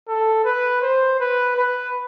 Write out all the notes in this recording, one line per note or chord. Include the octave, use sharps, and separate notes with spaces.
A4
B4
C5
B4
B4